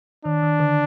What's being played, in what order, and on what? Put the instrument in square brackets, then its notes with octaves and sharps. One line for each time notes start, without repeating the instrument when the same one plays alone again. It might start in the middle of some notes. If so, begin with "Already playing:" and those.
[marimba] D#3 [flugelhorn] D4
[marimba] D#3
D3